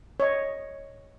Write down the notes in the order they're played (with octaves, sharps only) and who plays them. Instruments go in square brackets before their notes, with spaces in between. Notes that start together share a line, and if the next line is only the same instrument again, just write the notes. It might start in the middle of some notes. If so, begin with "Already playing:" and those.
[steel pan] C#5 D#5